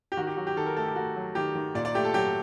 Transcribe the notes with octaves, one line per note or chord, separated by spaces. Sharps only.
G4
D#3 F#4
G4
F#3 F#4
G4
D#3 A4
A#4
A3 A4
G4
A3 F#4
F#3
D#3 G4
D#3
A#2 D5
D5
A3 G4
A4
F#3 G4